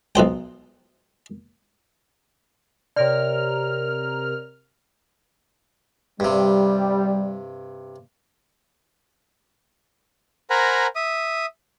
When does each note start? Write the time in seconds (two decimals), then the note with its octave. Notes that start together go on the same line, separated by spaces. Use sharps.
0.15 B1 B2 C5 G5
2.96 C3 A#4 C#5 D5 F6
6.20 G2 C3 G3
10.50 A#4 C5 F#5 G#5 A#5 B5
10.96 E5 D#6